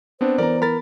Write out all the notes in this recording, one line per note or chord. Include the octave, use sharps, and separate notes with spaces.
B3 C4 D4 C5
E3 B3 A#4 D5 A#5
A#4 B5 A6